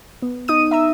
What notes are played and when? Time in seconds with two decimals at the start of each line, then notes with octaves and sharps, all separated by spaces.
0.22 B3
0.48 D#4 D#6 D#7
0.71 E5 A#5 E6